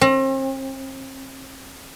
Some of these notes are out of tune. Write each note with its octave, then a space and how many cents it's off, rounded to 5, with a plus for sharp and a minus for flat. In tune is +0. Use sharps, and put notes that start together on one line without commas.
C4 +40